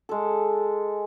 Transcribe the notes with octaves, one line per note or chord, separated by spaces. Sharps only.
G#3 A4